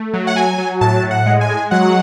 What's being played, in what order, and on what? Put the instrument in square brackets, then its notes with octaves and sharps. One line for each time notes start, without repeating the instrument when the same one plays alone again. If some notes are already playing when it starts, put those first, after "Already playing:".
Already playing: [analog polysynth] A3
F#3
F#5
F#3 G#5
F#3
A2 A5
A2
F#5
G#3
G#5
G#3
F#3 F#5